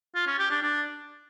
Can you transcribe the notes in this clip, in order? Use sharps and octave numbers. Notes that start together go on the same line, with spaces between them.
F4
C#4
G4
D4
D4